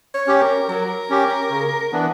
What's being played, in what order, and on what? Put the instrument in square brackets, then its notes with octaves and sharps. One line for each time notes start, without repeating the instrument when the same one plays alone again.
[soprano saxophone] C#5
[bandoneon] C#4 G4
[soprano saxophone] A#4
[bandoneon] F#3 [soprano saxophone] A#4
[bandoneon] C#4 G4
C#3
E3 B3 D4